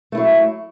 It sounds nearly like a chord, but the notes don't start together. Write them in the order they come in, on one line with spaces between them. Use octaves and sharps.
A3 E4 F#3